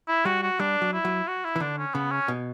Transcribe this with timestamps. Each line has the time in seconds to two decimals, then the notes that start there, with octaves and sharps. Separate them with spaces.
0.08 E4
0.25 G3 F#4
0.42 F#4
0.59 G3 D4
0.82 F#3
0.93 E4
1.05 F#3
1.27 F#4
1.44 E4
1.56 E3
1.60 D3 D4
1.78 C#4
1.94 C#3 B3
2.11 C#4
2.28 B2